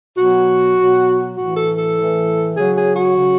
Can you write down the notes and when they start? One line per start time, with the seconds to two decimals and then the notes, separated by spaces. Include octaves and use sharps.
0.17 B2 F#3 F#4
0.78 B2 F#3
1.36 A2 E3 F#4
1.56 A4
1.76 A4
1.97 A2 E3
2.56 C#3 F#3 G#4
2.76 G#4
2.96 F#4
3.16 C#3 F#3